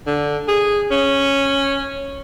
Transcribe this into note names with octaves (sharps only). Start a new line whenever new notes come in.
D3
G#4
C#4